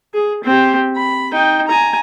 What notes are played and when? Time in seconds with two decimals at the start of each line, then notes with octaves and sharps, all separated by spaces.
0.14 G#4
0.44 C4 G4
0.96 B5
1.32 D#4 G5
1.67 G#5 A#5